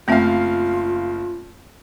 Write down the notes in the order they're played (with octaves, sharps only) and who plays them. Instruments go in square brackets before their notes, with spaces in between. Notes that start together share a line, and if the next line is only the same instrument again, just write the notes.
[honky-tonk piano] F#1 F5 [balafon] A3 C4 E5 [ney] F4